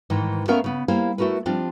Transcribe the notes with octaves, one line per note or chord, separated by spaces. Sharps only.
G#2 D#3 E3
A3 B3 C#4 A#4 E5 F5
C#3 B3
G3 A#3 E4 C5 F5
A3 E4 F#4 A#4 B4
F3 G3 C4 D4 F4